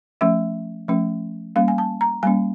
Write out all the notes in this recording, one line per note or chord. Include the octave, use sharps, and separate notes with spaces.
F3 A3 C#4 E5
F3 A3 C#4
G3 A#3 C#4 F5
G#5
A5
A#5
G3 A#3 C#4 G#5